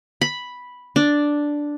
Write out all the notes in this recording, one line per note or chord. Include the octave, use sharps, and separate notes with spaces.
B5
D4